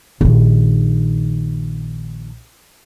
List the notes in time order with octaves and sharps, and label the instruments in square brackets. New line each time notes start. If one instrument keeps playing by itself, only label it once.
[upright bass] A#1 D#3